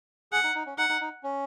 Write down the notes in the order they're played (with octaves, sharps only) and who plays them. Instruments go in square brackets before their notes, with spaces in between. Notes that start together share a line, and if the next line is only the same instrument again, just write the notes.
[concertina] G#4 [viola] F#5
[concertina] D#4
D#4
C#4
[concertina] D#4 [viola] F#5
[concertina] D#4
D#4
C#4